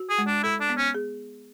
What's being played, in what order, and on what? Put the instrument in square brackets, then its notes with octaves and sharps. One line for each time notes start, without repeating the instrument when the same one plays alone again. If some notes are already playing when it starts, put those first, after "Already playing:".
Already playing: [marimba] F#4
[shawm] G#4
[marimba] G#3
[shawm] D4
[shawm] E4 [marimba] A4
[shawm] D4
[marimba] B3
[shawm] C#4
[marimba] G#4